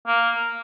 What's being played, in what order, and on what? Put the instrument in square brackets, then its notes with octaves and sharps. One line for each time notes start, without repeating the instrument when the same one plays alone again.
[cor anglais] A#3